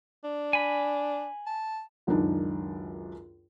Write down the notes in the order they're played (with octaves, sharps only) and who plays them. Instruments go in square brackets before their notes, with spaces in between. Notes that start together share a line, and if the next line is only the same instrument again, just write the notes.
[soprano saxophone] D4
[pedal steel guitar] G#5 B5
[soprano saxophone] A5
[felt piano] C#2 F#2 D#3 D4 D#4